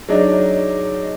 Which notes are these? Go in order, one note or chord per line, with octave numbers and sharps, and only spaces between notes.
F#3 D4 D#4 G#4 C#5 D#5